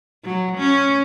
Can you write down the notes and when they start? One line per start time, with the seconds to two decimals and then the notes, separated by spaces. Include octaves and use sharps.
0.24 F#3
0.58 C#4